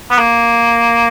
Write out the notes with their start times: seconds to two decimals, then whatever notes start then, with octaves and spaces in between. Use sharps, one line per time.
0.11 B3
0.19 A#3